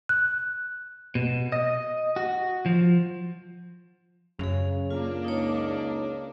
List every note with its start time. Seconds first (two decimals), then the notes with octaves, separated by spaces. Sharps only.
0.09 F#6
1.15 B2
1.52 D#5
2.16 F#4
2.66 F3
4.39 F#2 C#3 C#4 G#4
4.91 A#3 D4 F4
5.25 C#2 D#4 C#5